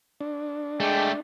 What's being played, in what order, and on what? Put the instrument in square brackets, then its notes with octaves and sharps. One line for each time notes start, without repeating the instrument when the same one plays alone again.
[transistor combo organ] D4
[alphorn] G#3 [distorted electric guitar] A3 G4 [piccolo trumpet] G5